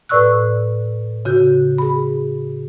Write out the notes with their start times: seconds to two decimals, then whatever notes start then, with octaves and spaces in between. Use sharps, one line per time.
0.09 A2 B4 D5 C#6 E6 F#6
1.25 C#3 F#4 G6
1.78 G#4 B5